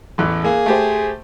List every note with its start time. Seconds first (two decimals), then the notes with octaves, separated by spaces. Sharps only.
0.18 A1 E2 A2
0.44 A#3 G#4
0.66 A3 G4 C5